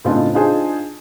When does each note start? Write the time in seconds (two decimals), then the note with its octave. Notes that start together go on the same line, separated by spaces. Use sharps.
0.05 A2 C#3 C4 D4 D#4 F4
0.34 D4 D#4 F4 G#4 C5